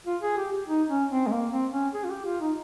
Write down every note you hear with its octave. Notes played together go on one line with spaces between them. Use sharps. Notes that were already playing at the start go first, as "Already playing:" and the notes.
F4
G#4
G4
D#4
C#4
C4
G#3
A#3
C4
C#4
G#4
F4
G4
F4
D#4